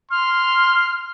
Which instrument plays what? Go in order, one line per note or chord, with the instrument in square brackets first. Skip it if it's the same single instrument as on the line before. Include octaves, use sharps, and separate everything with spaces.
[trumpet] C6 [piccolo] F6